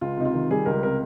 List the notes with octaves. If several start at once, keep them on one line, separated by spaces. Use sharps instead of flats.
C#2 F4
C3 D#4
F4
D#3
G3 G#4
C#2 A#4
C3 A#4